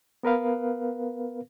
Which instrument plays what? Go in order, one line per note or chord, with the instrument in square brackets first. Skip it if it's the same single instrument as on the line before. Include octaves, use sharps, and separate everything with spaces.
[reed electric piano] B3 A#4 B4 F5